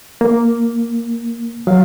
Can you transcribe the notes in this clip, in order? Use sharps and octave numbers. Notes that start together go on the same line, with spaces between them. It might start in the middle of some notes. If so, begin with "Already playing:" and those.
A#3
F#3 F5